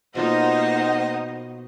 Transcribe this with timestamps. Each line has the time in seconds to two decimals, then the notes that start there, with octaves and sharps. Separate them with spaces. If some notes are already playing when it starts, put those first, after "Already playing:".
0.15 B2 A#3 D#4 F4 C5 D#5 F#5